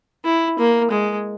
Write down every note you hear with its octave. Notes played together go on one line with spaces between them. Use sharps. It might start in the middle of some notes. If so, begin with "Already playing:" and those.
E4
A#3
G#3